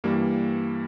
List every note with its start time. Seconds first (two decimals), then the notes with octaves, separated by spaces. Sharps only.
0.04 G2 E3 G3 A#3